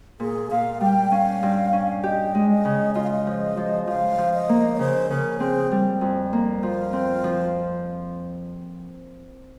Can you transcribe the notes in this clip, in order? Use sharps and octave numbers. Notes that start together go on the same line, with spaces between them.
A#2 G#4
A#2 F5
G3 G5
C#4 F5
G2
C#4
G4 D#5
G#3
D#5
C#3
F4 D#5
F5
D#5
F3
F3
F3 F5
F3
D#5
A#3
C#5
C#3 C5
C#3 A#4
C4 G#4
G3
F2
A#3
F3 F4
C4
F3